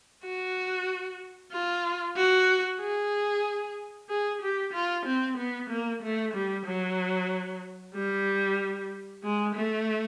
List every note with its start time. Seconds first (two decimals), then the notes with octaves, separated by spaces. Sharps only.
0.24 F#4
1.52 F4
2.17 F#4
2.81 G#4
4.09 G#4
4.42 G4
4.73 F4
5.05 C4
5.37 B3
5.69 A#3
6.02 A3
6.34 G3
6.66 F#3
7.95 G3
9.23 G#3
9.55 A3